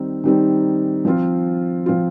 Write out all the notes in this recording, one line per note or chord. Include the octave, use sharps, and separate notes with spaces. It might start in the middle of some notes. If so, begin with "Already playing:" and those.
Already playing: D#3 G3 C4 D#4
D#3 G3 C4 D#4
F3 C4 F4
F3 C4 F4